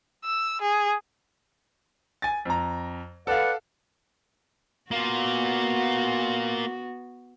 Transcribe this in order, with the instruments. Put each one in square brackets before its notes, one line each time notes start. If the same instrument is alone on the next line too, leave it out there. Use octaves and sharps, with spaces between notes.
[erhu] E6
G#4
[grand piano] G#5 A6
F2 A#5
[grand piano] A4 F5 [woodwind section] B4 D5 F#5
[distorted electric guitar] A#3 F4 [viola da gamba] B3 F#4